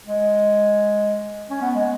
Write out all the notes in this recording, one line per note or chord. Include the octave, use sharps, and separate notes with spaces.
G#3
C#4
B3
G#3